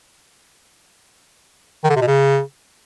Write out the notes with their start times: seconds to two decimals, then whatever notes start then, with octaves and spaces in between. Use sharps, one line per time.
1.84 D#3
1.90 D3
1.96 C3
2.02 B2
2.07 C#3